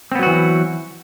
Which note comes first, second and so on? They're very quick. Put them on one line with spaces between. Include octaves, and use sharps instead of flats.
C4 B3 F#3 F#4 E3